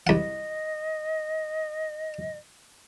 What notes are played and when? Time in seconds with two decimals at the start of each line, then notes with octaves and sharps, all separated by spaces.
0.07 C2 D#5 F#5